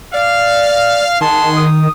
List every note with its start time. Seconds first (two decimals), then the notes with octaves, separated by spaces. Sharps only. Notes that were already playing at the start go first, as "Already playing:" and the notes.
0.14 D5 F5
1.21 D#3 G#4 F#5 A5 C6
1.56 D#6